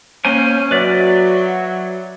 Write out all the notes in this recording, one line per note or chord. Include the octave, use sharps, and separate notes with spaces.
A#3 C#4 C5 G#5
F#3 B4 D5 E5